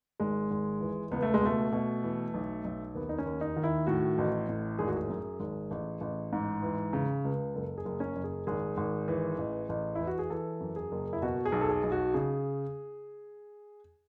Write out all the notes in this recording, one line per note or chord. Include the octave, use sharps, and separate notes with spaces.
G#1 G#3
G#1
E3
C#2 B3
A3
G#3
B2 A3
B2
E3
B1
B1
D#2 B3
D#4
C#4
D#2
D#4
D#3
E4
A2 F#4
A1
A2
G#1 G#4
F#4
G#4
F#2
G#1
A1
A1
G#2
E3
C#3
C#2
F#1 A4
G#4
F#1
C#4
F#1
G#4
G#1 G#4
G#1
E3
A1
A1
E3 E4
F#4
G#4
E3 A4
F#2
G#4
F#1
E4
B2 F#4
G#4
B1
A4
G#4
B1
F#4
C#3 G#4